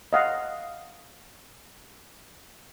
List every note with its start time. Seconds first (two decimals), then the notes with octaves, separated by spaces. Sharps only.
0.13 D#5 F5 F#5